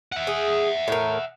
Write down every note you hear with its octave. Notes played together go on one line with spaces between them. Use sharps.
E5 F#5
G#4
A2 A#4